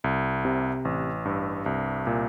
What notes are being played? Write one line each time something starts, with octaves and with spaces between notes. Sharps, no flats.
C2
C3
A1
G2
C2
A#2